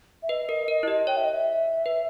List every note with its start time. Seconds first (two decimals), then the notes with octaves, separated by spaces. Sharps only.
0.23 E5
0.29 B4 D#5
0.49 A#4 D#5
0.68 A#4 D#5
0.83 E4
0.88 G4 D#5
1.07 C#5 G5
1.17 E5
1.25 D#5
1.33 E5
1.86 B4